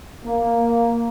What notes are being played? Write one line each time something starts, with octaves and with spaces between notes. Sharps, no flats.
A#3